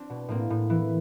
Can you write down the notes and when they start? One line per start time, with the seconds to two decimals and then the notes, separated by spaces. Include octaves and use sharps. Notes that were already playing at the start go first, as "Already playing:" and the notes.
Already playing: C4 D4
0.10 B2
0.28 A2 A#3 C4
0.50 A2
0.70 E3